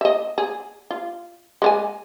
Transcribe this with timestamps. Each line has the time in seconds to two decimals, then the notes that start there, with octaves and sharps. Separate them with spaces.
0.01 D#5 E5
0.38 G#4
0.90 F4
1.62 G#3 A#4 G#5